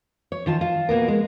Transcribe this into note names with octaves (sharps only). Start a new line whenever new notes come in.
C#5
D#3 F4 A5
F4
B2 A#3 B3 A#4
G#3